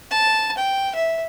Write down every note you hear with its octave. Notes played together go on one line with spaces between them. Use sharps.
A5
G5
E5